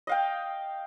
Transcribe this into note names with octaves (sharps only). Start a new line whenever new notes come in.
D#5 F5 G5